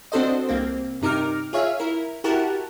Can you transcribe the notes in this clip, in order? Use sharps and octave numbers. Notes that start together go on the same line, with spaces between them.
C4 D4 F#4 A4 C5 D#5
C2 A#3 C4
G2 C3 D#4 A#4 D6 F6
F4 G#4 C#5 E5 F5
E4 A#4
E4 F#4 G4 A#4 F#5 A5